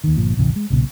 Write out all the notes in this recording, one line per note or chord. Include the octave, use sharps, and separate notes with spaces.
D#2 D#3
G1 A#2 F3
D1 G#1 C3 E3
G#3
B1 A#2 C#3